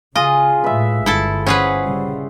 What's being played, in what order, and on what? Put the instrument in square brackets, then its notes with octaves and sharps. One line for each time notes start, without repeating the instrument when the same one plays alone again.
[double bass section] C#3 [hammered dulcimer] F4 G#4 [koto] D#5
[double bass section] A2 G#3 [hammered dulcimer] B4 E5
[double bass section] G1 [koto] E4 A4 A5
[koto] C#4 G#4 B4 [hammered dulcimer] C5 F#5
[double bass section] C#3 G3